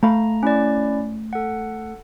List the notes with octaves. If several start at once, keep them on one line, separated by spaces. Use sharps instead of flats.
A3 F5 A#5 B5
C#4 E4 D5
A4 F#5